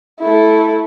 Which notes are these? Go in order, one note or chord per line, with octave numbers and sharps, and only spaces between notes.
A3 E4